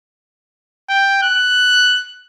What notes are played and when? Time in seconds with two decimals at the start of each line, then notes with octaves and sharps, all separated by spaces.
0.90 G5
1.23 F#6